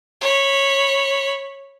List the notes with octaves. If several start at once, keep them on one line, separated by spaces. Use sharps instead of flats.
C#5 B5